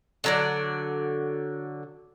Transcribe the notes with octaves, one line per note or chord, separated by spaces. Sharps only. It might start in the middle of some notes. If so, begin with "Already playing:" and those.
D3 F#3 D5